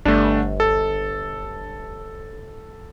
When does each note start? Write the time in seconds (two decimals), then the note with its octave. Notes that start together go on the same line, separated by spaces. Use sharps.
0.05 G1 A3 D4
0.60 A4